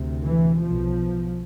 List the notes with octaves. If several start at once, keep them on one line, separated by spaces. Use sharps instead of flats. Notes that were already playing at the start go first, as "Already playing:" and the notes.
Already playing: D2 C3
E3
B1 B2 F3